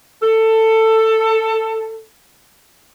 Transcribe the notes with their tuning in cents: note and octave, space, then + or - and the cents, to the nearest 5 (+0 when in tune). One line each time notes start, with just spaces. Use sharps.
A4 +15